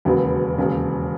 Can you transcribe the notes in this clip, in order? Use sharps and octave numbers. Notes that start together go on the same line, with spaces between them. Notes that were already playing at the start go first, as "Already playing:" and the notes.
E1 D#2 C#3 F#3 B3
E1 D#2 C#3